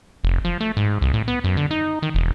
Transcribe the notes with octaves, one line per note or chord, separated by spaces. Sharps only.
F1
F3
A3
G#2
C2
A2
B3
F#2
D3
D#4
D#3
E1